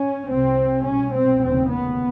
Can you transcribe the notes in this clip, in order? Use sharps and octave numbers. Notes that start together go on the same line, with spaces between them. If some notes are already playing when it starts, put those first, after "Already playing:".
Already playing: C#4
C2 C3 C4
C2 B2 C#4
C4
F1 D#2 C#3 C4
B3